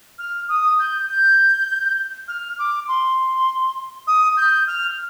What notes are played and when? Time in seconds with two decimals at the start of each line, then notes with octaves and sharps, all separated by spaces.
0.18 F6
0.48 D#6
0.79 G6
1.08 G6
2.28 F6
2.58 D6
2.88 C6
4.07 D#6
4.37 G6
4.67 F6